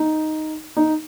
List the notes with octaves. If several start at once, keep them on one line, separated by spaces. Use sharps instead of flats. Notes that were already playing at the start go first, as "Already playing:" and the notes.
Already playing: D#4
D#4